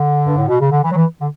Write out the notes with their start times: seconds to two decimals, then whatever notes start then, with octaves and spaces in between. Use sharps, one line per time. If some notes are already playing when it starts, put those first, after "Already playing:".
Already playing: D3
0.25 G2
0.37 A2
0.48 B2
0.59 C#3
0.70 D3
0.82 E3
0.91 F#3
0.95 E3
1.21 D3